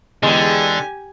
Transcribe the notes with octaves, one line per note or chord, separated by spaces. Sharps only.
E2 D3 G#3 G4 G#5